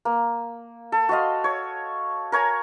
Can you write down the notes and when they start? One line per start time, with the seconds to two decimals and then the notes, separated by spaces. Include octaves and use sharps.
0.05 A#3
0.92 A4
1.09 F#4 C5 D#5 F5
1.44 C#5
2.32 A#4 C#5 G#5 A#5